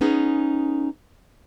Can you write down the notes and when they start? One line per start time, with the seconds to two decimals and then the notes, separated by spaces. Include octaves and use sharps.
0.01 B3 C#4 D#4 G#4